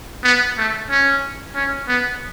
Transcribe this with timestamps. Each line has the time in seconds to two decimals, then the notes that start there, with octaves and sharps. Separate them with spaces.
0.24 B3
0.58 A3
0.90 C#4
1.55 C#4
1.88 B3